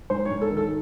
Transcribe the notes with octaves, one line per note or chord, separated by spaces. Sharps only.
G#2 C5
C#5
G#2
A4
D#3
A4